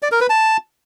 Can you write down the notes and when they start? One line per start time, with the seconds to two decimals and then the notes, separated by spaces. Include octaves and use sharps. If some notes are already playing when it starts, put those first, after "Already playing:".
0.03 D5
0.12 A#4
0.21 B4
0.30 A5